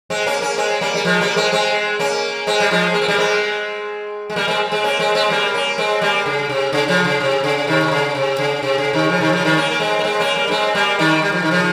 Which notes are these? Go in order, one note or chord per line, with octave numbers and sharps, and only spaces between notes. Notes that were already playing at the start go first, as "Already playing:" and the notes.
G#3 C4
A#3 C#4
A#3 C#4
G#3 C4
G3 A#3
G3
F3 G#3
G3 A#3
G#3 C4
G#3 C4
A#3 C#4
G#3 C4
G3
F3 G#3
A#3
C4
G3 A#3
G#3 C4
G#3
G3 A#3
G#3 C4
G#3 C4
A#3 C#4
G#3 C4
G#3 C4
G3 A#3
A#3 C#4
G#3 C4
G3 A#3
C#3
C3
C#3
C#3 F3
C#3
C3
C#3
C3 D#3
C3
C#3
C3
C#3
C3
C#3
C3 D#3
C#3 F3
C3 D#3
C#3 F3
D#3 G3
A#3 C#4
A#3
G#3 C4
A#3
G#3 C4
A#3 C#4
G3 A#3
C#4
G#3 C4
G3 A#3
D#3 G3
G3
F3
D#3
C#3 F3